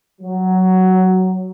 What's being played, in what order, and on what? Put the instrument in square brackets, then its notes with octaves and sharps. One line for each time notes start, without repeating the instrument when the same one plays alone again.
[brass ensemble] F#3